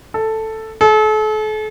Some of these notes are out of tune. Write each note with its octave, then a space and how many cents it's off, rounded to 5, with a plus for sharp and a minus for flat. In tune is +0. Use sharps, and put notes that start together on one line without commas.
A4 +5
A4 -40